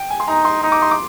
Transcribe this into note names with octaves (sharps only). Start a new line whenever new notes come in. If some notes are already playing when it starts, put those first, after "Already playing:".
Already playing: G5
G#5
C6
D#4 A#5
C6
D#4 D#6
D6
C6
D6